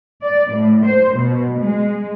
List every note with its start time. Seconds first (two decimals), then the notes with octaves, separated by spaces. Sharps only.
0.24 D5
0.53 A2
0.85 C5
1.16 B2
1.60 G#3